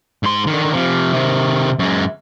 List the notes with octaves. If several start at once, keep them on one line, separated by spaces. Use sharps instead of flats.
G#2 C6
D3 D#3
C3 F3
C3 D#3
F#2 G#3